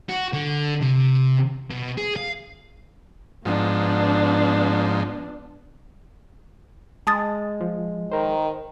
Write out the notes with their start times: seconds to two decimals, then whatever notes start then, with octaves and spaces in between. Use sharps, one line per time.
0.09 F#4
0.33 D3
0.82 C3
1.71 B2
1.98 G#4
2.16 F5
3.45 G#2 F3 B3 D4
7.07 G#3 A5 D#6 A6
7.61 F3
8.12 D#3 A#4 C5